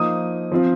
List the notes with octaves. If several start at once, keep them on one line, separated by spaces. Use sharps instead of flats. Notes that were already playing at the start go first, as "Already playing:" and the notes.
Already playing: F3 A#3 D#4 D#6
F3 C4 F4